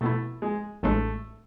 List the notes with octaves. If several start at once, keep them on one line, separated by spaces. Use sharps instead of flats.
B2 A3 B3 E4
G#3
A1 A2 G#3 A3 D4